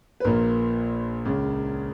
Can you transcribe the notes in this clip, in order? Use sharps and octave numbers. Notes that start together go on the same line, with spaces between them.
B4
A#1 A#2 A#4
C#2 C#3